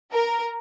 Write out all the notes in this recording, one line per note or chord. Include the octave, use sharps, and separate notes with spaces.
A#4